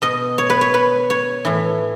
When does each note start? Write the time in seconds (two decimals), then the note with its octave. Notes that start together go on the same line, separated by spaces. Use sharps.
0.02 B2 D#5
0.38 C#5
0.50 B4
0.61 C#5
0.74 B4
1.10 C#5
1.45 A2 E3